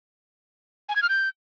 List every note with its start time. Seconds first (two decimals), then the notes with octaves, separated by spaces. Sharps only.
0.89 G#5
0.96 G#6
1.02 F6
1.09 G6